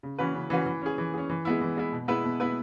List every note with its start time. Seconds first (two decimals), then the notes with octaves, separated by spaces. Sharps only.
0.03 C#3
0.19 E3 C#4 F#4 B4
0.34 C#3
0.50 E3 C#4 F#4 B4
0.66 E3
0.82 C#4 G#4
0.98 E3
1.14 C#4 G#4
1.30 E3
1.45 G#3 B3 E4
1.61 E3
1.77 G#3 B3 E4
1.92 B2
2.08 G#3 B3 E4 B4
2.24 B2
2.40 G#3 B3 E4 B4